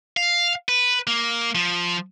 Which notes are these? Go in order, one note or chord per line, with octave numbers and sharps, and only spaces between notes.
F5
B4
A#3
F3